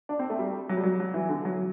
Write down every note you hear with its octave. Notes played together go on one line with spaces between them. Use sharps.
D4
C4
A3
G3
F#3
G3
F#3
F#3
E3
D3
F#3